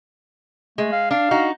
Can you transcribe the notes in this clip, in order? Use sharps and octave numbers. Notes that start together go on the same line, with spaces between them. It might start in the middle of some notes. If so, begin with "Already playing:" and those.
G#3 A3
F5
D4 F5
D#4 F#4